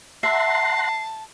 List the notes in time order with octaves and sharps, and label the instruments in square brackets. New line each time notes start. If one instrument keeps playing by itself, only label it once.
[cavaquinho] E5 [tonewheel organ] F#5 A#5 C6 [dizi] A5 [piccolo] C7